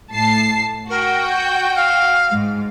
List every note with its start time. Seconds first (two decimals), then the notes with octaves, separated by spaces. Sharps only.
0.12 A2 A5 C7
0.89 F#4 A#4 G5
1.29 G6
1.75 F5
2.31 G#2